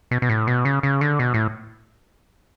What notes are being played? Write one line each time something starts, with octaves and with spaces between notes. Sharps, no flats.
B2
B2
A2
B2
C#3
C#3
D3
B2
A2